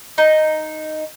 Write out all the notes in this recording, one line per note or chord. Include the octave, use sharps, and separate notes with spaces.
D#4